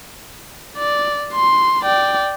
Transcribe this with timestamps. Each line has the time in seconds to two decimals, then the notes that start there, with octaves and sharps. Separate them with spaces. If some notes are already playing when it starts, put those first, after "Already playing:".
0.77 D5
1.34 C6
1.83 D5 G5